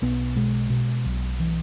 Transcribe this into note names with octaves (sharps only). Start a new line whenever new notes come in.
B1 B3
B2 G#3
B2
B1
E3